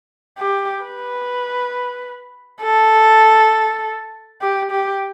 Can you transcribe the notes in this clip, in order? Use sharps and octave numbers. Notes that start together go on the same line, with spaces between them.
G4
B4
A4
G4
G4